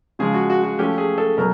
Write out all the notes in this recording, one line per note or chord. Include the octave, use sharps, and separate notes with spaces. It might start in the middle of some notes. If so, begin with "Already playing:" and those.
C#3 F3 G#3 G#4
F#4
F#4
F#4
F3 A3 C#4 G4
G#4
A4
B2 F#3 A#4